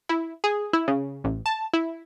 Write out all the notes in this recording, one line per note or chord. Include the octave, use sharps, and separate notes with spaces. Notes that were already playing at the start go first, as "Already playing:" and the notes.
E4
G#4
E4
C#3
A1
A5
E4